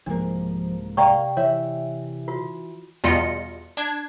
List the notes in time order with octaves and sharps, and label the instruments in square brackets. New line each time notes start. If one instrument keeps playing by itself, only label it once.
[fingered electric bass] C2 G#2 A#3 [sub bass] F3 [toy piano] D4
[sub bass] C3 [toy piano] D5 G5 C#6 [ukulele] F5 A#5
[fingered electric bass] E3 [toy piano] C#5 [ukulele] E5
[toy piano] F4 F#4
[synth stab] E2 B2 G3 F4 D#5 C#7
D4 G#6